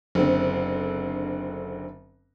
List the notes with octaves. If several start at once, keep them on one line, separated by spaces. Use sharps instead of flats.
F#1 D3 C4